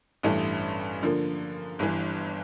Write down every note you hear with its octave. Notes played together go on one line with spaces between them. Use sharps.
A1 G2 E3 A3
D3 F3 A#3
G1 G2 E3